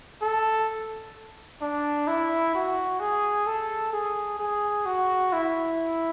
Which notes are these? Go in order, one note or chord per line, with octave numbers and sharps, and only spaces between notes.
A4
D4
E4
F#4
G#4
A4
G#4
G#4
F#4
E4